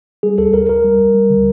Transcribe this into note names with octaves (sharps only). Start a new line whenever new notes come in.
G3 G#4
D2 A4
D2 A#4
D2 A#4
G3
D2
G3
D3